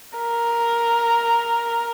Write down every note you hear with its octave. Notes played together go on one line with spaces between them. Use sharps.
A#4